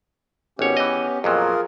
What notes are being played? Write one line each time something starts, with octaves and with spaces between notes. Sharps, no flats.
G#1 B3 C#4 G4 C#5
E3 D#5
F2 A#2 F#3 F4 G#4 A#4